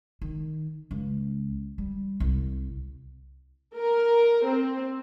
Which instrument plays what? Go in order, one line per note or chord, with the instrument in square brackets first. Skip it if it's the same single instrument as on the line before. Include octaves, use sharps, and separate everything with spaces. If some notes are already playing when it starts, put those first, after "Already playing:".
[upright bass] D#3
C#2
G3
C2
[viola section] A#4
C4